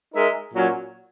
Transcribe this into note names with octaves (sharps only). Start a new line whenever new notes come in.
G#3 D#4 A#4 E5
A#2 F#3 C#4